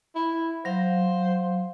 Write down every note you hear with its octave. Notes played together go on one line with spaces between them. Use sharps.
E4
F#3 C5 F5